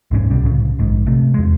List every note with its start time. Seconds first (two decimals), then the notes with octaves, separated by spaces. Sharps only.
0.11 B1 G#2 D#3 C#4
0.30 C2 B2 G3
0.43 C2 A2 C#3
0.79 A#1 G#2
1.06 C3 A3
1.34 E2 G#3